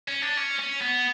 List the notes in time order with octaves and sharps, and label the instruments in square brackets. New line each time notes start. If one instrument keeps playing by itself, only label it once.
[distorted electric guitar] C#4
D4
C#4
C#4
B3